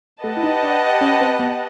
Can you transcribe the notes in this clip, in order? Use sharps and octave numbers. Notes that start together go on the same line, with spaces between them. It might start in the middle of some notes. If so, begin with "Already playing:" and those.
A3 G4 B4 D#5 F#5 A5
E4
D#4
D4
C#4
C4
B3